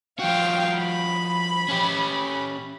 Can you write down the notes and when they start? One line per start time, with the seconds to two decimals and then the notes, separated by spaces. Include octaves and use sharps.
0.19 F3 F#4 F5 G5
0.78 B5
1.69 C#4 G4